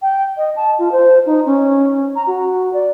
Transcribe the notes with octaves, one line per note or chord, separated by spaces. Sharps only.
G5
D#5
A5
F4
C5
D#4
C#4
A#5
F#4
D5